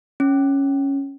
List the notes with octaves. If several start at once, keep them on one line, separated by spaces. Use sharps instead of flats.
C#4